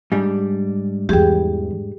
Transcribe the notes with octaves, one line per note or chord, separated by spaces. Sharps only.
G#2 G3 D4
E2 E3 G4 G#4 G5